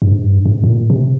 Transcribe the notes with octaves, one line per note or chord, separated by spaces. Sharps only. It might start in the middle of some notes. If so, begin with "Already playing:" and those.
G2
G#2
G2
G#2
G#2
A#2
C3